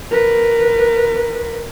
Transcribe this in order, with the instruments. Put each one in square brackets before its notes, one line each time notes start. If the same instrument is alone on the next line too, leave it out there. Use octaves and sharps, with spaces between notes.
[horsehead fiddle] A#4 B4